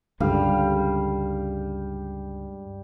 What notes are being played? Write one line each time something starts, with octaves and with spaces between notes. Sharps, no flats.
C#2 G2 D3 G3 G#3 F5